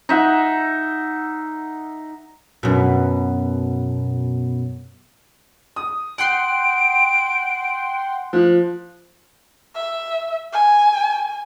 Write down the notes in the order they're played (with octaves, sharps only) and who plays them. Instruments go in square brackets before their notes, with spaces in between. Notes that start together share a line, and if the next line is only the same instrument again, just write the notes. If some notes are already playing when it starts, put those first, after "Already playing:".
[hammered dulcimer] D#4 E5 F#5
[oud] F#2 B2
[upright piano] D#6
[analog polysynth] F#5 G5 C6 [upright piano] F#6 [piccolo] D7
[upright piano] F3 [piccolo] F#6
[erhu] E5
G#5